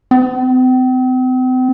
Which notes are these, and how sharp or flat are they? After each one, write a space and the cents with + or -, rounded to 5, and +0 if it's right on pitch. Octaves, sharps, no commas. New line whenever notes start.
C4 -40